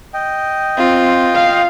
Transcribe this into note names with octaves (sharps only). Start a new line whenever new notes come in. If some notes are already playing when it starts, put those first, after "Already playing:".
D#5 G5
C4 F4
F5